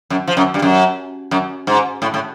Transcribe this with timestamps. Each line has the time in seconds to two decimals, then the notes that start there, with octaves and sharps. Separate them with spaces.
0.10 F#2
0.28 F3
0.37 F#2
0.54 G2
0.62 F#2
1.31 F#2
1.67 G#2
2.02 A2
2.14 A2